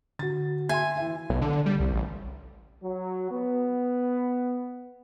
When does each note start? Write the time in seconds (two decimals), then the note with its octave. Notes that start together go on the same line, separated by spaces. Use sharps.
0.19 D3 F#4 A6
0.69 E5 G#5 C6
0.97 E3 E5
1.30 B1
1.42 D3
1.66 G3
1.80 C2
1.93 A1
2.83 F#3
3.30 B3